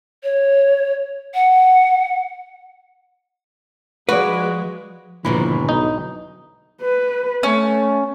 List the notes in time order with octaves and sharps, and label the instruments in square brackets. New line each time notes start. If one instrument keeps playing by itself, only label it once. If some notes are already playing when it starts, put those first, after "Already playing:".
[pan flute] C#5
F#5
[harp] F3 [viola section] G#3 [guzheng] F#4 [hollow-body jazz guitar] B4 D5
[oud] D#2 G#2 B2 [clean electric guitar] D3 E4 B5 [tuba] F3
[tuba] B1 [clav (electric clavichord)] D#4
[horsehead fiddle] B4
[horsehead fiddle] A3 [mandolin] C#4